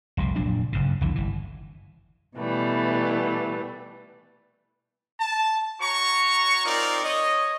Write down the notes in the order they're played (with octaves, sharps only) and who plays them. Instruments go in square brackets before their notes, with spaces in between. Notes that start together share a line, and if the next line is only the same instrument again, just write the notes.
[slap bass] F1 C2 A#2
F1 A#2 F#3 D4
F#1 G2 C#3
C2 F2 D3 E3
G1 E3
[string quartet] B2 E3 G3 A3
[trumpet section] A5
F#4 C#5 A#5 C#6
C4 D#4 F4 A#4 D5
C#5 D#5